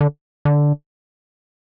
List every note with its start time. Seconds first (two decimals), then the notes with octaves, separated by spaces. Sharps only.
0.01 D3
0.45 D3